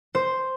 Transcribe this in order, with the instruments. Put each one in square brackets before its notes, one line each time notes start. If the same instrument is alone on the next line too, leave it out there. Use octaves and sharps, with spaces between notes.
[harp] C5